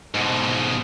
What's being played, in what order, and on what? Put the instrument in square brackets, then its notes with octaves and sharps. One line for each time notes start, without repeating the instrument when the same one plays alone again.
[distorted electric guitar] G#2 B2